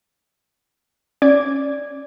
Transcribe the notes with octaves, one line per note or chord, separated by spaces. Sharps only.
C#4 D5 D6 G#6